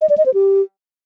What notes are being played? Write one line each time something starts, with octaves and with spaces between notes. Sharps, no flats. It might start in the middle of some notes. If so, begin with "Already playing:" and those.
D#5
D5
D#5
C5
G4